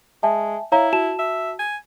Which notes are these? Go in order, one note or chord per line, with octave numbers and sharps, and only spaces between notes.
G#3 E5 G#5 A5
E4 C#5 F5 A#5
F#4 A5 E7
E5
G#5